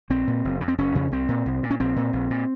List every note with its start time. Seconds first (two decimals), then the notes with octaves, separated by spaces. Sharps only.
0.10 A#1 C4
0.27 A#2
0.45 F#1
0.61 F2 C#3
0.68 C4
0.78 F#1 C#4
0.95 F2 C#3
1.11 C2 C4
1.29 A#2
1.46 C2
1.63 A#2
1.71 C#4
1.80 A#1 C4
1.96 A#2
2.13 A#1
2.30 A#2